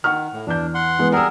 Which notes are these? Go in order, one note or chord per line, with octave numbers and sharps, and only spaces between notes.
D#3 F#5 C#6 F6
A2
E2 D4 G6
F#5 C6
E3 G#3 B3
G3 G#4 A#4 F#5 E6